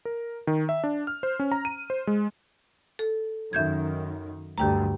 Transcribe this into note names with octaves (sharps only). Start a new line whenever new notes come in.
A#4
D#3
E5
D4
F6
C5
C#4
A#5
D#7
C5
G#3
A4
F#2 D#3 E5 G6 G#6
D2 G2 D3 G4 G5 A#5